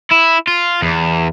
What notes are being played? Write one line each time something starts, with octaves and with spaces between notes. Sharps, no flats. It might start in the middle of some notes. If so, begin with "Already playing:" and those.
E4
F4
E2